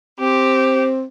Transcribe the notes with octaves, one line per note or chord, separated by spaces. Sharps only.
C4 G4